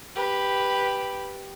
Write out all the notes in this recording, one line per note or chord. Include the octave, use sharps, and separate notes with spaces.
G4 B4